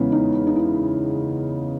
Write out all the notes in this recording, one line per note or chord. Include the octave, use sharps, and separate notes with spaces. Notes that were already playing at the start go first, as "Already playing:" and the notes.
Already playing: E2 C#3 E3 G#3 B3
D#4
D#4
E4